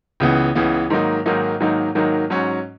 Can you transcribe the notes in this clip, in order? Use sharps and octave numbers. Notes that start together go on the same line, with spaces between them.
C#2 C#3 E3 B3
C#2 C#3 E3 B3
G#2 D#3 F#3 A#3 D#4
G#2 D#3 F#3 A#3 D#4
G#2 D#3 F#3 A#3 D#4
G#2 D#3 F#3 A#3 D#4
G#2 F#3 C#4 F#4